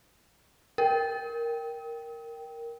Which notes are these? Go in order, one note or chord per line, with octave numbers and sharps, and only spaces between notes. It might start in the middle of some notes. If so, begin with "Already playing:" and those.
A#4 G5